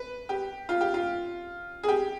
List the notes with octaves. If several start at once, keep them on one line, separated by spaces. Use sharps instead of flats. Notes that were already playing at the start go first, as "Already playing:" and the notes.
Already playing: B4
G4
F4
G4
F4
G#4
G4